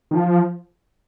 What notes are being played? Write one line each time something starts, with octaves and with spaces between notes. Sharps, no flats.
D#3
F3